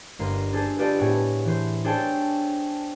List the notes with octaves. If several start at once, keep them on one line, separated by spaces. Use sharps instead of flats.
G1 A#3 D#5 C6
D4 G#4 A4 C5
F4 G4 A4 B4 D5 D#5
A2 B3 G#4 C#5 F#5
E3 C5
D4 G#4 A4 C5 C#5 G5